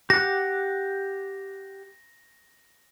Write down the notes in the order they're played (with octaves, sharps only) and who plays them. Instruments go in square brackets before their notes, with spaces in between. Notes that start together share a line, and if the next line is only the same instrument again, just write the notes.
[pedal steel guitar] G4 F#5 F#6 [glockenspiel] A#6